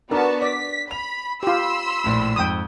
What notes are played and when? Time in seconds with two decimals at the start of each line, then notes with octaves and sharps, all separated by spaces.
0.11 B3 D4 F#4 A#4 A5
0.42 D5 B6
0.91 B5 F7
1.43 F4 G4 B5 C6 E6
2.04 A#1 A2
2.36 F2 G#2 G5 D#6